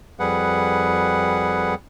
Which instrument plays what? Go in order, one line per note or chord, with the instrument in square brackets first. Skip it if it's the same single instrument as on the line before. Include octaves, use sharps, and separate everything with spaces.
[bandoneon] F2 G3 G#4 B4 F#5